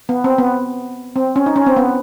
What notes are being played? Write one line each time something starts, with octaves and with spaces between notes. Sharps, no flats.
B3
C4
B3
C4
C#4
D#4
C#4
C4
B3